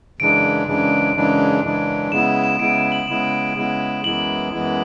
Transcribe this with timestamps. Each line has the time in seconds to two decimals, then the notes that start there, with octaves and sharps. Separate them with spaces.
0.19 F#2 C#3 E3 G#3 D4 D7
0.67 F#2 C#3 E3 G#3 D4
1.16 F#2 C#3 E3 G#3 D4
1.64 F#2 C#3 E3 G#3 D4
2.11 C#3 G#3 B3 E4 E7
2.44 E7
2.59 C#3 G#3 B3 E4 D7
2.75 E7
2.92 F#7
3.08 C#3 G#3 B3 E4 E7
3.56 C#3 G#3 B3 E4
4.04 F#2 E3 G#3 B3 E4 F#7
4.52 F#2 E3 G#3 B3 E4